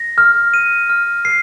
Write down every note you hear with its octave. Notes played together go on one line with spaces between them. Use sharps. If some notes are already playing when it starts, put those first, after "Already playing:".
Already playing: A#6
F6
D#7
F6
C7